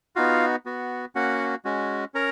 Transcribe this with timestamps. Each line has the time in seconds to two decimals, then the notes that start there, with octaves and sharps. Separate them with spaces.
0.16 B3 D#4 F4 F#4 F5
0.66 B3 F#4
1.15 A#3 C#4 F#4 F#5
1.65 G#3 C#4 F#4
2.14 C#4 A#4 A#5